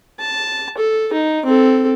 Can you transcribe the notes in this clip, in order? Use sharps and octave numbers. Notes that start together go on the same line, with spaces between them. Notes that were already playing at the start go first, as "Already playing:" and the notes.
A5
A4
D#4
C4 A4